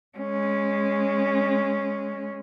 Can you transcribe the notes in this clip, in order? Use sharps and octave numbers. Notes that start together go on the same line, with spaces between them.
G#3 C#4